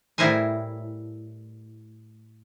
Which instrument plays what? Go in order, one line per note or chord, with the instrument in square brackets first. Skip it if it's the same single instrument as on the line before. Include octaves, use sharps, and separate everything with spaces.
[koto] A2 G3 E4 A#4 C5 G#5